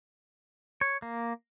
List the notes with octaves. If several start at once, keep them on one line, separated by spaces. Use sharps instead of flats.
C#5
A#3